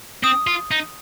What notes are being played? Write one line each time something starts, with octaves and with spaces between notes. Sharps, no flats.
C4 D#6
F4
D#4